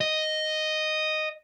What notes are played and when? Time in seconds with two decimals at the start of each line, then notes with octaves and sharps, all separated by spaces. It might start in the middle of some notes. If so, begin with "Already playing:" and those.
0.01 D#5